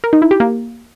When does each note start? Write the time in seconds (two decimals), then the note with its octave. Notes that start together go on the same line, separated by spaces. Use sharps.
0.04 A#4
0.13 D#4
0.22 E4
0.31 G4
0.40 A#3